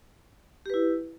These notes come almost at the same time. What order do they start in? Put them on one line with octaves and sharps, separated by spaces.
G4 B4 E4